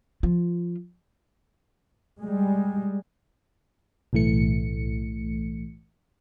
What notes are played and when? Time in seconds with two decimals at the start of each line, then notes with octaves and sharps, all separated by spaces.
0.23 F3 F4
2.20 G3 G#3
4.13 B1 A2 E3 A3 C#7